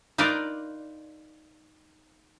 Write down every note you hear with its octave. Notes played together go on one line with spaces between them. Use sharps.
D#4 F4 A#4 B4 D5